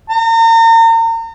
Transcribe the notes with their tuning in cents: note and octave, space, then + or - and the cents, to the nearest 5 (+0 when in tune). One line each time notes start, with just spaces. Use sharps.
A#5 -40